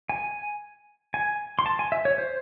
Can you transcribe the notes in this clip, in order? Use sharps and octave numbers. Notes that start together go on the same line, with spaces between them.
G#5
G#5
C6
A5
G#5
E5
C#5
C5